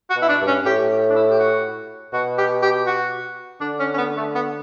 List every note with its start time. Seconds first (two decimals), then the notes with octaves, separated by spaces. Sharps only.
0.10 F#4
0.16 B2
0.22 E4
0.29 D4
0.41 G2
0.47 C#4
0.66 A2 G4
1.10 D4
1.15 E4
1.30 G4
1.40 F#4
2.13 B2 F#4
2.38 G4
2.62 G4
2.87 F#4
3.61 D3 D4
3.80 C#4
3.94 C#4
3.98 B3
4.17 A3
4.35 B3